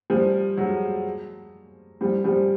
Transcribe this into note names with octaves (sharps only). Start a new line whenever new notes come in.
F3 G3
F#3 G#3
F3 G3
F3 G3